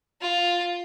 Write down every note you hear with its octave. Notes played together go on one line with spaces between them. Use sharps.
F4